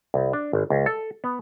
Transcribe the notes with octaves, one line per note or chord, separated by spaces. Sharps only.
C2
D4
G#1
C#2
A4
B3